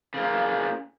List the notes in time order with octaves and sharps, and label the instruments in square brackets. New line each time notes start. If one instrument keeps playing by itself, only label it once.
[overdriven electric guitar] C#3 A#3